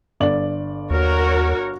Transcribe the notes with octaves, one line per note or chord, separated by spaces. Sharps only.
G1 D5 F#7
D#2 F#4 A#4 C#5